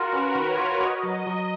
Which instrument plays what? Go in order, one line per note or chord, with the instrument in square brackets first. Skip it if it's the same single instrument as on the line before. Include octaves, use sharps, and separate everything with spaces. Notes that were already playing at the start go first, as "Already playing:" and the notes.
Already playing: [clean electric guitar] F4 [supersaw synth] F#4 A#4
[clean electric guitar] C#4 [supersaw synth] B4
[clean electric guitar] D#3
[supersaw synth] C#5
[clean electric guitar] F4
[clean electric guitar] F#4 [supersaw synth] D#5
[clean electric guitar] F#3
[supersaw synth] D#5
[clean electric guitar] F#3